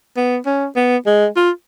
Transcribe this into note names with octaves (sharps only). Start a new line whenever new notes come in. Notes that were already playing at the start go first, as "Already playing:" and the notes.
B3
C#4
B3
G#3
F4